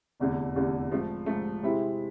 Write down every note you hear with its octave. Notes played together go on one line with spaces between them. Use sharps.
F1 E2 D3 A3
F1 E2 D3 A3
G#2 F3 A3
G#2 F3 A3
C3 G#3 C4 E4